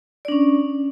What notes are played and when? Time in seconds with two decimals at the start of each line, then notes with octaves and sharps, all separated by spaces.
0.25 D5
0.28 D4
0.32 C#4